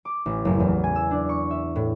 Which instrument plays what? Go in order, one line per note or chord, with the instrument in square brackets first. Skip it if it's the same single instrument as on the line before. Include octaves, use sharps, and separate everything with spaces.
[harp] D6
A1
F#1
E2
G#5
E6
D4
C#6
E5
A2